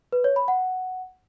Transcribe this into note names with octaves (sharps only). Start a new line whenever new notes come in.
B4
C#5
B5
F#5